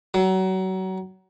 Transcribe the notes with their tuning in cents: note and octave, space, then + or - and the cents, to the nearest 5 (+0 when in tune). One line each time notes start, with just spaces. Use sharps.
F#3 +30